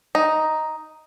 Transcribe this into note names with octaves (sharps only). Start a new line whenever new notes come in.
D#4